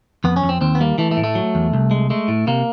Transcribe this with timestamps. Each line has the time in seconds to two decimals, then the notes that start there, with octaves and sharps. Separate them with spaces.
0.24 F2 B3
0.36 C#4
0.43 F2
0.49 C4
0.61 D#2 C4
0.75 B3
0.80 G3 A#3
0.98 E3 A3
1.11 A3
1.17 A2
1.24 A3
1.35 F#3
1.55 E2
1.74 C2
1.91 G#3
2.10 G#3 A3
2.28 A2
2.47 C3 A#3